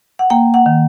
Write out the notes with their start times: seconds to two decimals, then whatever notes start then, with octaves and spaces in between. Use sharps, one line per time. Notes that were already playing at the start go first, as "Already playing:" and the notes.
0.19 F#5
0.30 A#3 G5
0.54 F#5
0.66 D#3